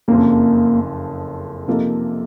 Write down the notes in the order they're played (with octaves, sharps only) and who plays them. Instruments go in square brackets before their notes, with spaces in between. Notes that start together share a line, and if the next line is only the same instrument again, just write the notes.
[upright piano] F#1 F2 C#3 [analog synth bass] A#3
[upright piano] C3 F3 A#3 D#4 A4